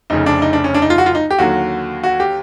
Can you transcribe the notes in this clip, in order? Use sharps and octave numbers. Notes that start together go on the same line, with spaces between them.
F1 F2 C#3 D#4
D4
D#4
D4
C#4
D4
D#4
F4
F#4
F4
D#4
G4
D#2 D3 F#3 F#4
F#4
G4